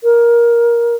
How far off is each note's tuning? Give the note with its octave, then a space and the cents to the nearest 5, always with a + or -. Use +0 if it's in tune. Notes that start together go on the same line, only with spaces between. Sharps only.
A#4 +15